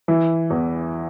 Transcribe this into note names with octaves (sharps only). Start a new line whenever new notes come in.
E3
E2